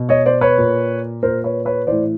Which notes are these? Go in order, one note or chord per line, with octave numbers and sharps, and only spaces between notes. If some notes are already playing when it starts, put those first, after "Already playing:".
Already playing: B2
C#5 D#5
C5 D5
B4 C#5
A#2
A#2 A#4 C5
B4 C#5
B4 C#5
A2 E3 C5 D5